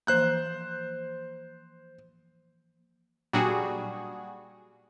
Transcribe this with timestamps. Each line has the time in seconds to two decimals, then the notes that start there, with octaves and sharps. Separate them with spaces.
0.07 E3 F3 A#3 C5 F#6 G6
3.33 A#2 F#3 G3 D4 F#4 G#4